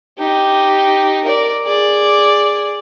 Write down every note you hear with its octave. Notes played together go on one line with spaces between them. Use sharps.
D#4 G4
A#4 D5
G#4 D5